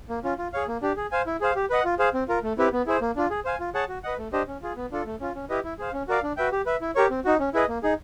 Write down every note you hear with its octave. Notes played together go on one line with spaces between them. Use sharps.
A#3
C#4 F4
F4
G#4 C#5 F5
A#3
D4 G4
G#4
C5 F5 G#5
E4
G#4 C5 F5
G4
B4 D#5 F#5
F4
G#4 C5 F5
C4
F4 A#4
A3
C4 E4 G4 B4
B3
E4 G#4 C5
A#3
D4 F4
G#4
C5 F5 G#5
F4
G#4 C#5 F#5 A5
F#4
B4 D#5 F#5
A3
D4 G4 C5 D#5
C#4
F4 G#4
B3
D4 F4 A4
A3
C#4 F4
C#4
E4 G4 B4 D#5
E4
G#4 C5 F5
C#4
F#4 A#4 D5 F5
D4
F#4 B4 E5 G5
G4
B4 E5
E4
G4 A#4 C#5
C4
D#4 F#4
C#4
E4 G#4 B4 D#5
A#3
D#4 G#4